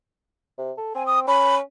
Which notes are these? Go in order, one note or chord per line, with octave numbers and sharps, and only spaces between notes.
C3
A4
C4 G#5
D#6
C#4 B5